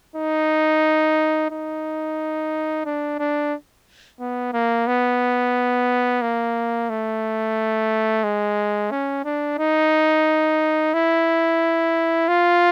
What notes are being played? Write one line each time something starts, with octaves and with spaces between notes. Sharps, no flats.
D#4
D#4
D4
D4
B3
A#3
B3
A#3
A3
G#3
C#4
D4
D#4
E4
F4